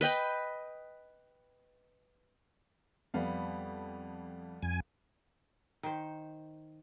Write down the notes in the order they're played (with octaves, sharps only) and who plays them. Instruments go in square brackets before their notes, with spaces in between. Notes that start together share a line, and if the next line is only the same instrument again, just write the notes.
[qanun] B4 D#5 G5 B5
[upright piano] F2 [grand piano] G3 B3 F5
[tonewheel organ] F2 G#5
[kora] D#3 C5